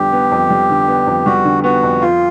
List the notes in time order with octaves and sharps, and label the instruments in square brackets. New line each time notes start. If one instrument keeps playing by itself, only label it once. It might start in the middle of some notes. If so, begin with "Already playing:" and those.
Already playing: [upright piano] F2 D3 G3 B3 [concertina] G4
[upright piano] B3
F2
G3
D3
B3
F2
[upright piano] G3 [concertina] F#4
[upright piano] D3
[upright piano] B3 [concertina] F#4
[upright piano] F2
[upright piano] F3 [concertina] F4